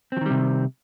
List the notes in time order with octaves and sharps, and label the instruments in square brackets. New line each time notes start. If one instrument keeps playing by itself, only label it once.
[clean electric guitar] C4
F3
D#3
G3
C3